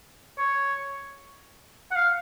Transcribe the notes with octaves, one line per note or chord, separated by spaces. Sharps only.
C#5
F#5
F5